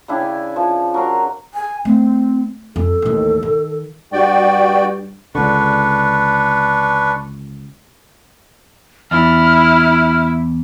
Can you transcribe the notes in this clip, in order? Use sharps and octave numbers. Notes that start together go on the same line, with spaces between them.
C#3 D4 E4 G4
G#5
F3
F#3 A#4 C6
G#5
A3 C4
F2 A4
A1 D#2
D#3
G2 F#4 D5 G5
C#2 D3 D4 B4 C#6
E2 E4 F6